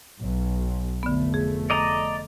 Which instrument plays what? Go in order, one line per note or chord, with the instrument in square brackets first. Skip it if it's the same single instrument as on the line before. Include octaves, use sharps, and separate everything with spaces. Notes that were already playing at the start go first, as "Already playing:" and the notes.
[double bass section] B1
[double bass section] F1 A3 [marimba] D3 B3
[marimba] G#4
[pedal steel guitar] D5 D#5 A#5